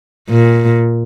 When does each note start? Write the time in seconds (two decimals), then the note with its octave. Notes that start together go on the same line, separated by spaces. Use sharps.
0.29 A#2